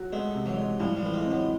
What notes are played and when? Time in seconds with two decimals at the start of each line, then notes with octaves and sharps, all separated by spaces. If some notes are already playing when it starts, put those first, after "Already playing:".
Already playing: F#3
0.13 G#3 A3 B3
0.34 C3
0.46 E3 F#3
0.57 G#3
0.80 A2 F3 G3
0.96 F3 G3
1.03 E3 A3
1.13 G#3 A#3
1.25 C4
1.31 F#3 G#3